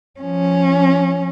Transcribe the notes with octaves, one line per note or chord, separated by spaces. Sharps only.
F3 C#4